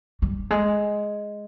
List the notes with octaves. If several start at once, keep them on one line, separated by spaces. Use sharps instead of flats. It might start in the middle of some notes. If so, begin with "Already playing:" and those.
G3
G#3